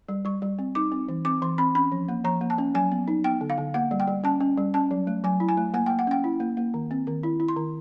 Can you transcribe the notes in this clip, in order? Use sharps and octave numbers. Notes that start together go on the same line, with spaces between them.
G3
G3 C#6
G3
C4
D#4 D6
C4
E3
C4 D6
E3 C6
C4 B5
C#4 B5
F3
A#3
F3 A#5
A#3
A5
C#4
F#3 G#5
B3
D#4
B3 G5
D3
F5
D3
A#3 F#5
G3
G5
G3
C#4 A5
C#4
G3
C#4 A5
F#3
A3
F#3 G#5
E4
G#5
A3
A#3 G#5
A#3 G5
F#5
C#4 G5
E4
A#3
A#3
D#3
C4
D#3
E4
E4
C6
D#3